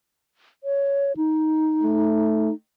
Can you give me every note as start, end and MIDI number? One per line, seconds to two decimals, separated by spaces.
0.64 1.13 73
1.17 2.53 63
1.83 2.50 57